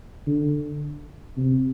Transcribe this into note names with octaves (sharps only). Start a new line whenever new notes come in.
D3
C3